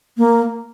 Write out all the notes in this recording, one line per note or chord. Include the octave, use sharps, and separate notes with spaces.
A#3